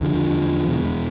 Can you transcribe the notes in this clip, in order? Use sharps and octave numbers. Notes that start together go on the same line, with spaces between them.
E2 D3 F3
E1 E2 B2